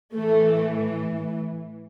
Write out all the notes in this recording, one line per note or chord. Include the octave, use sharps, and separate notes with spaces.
A2 E3 A3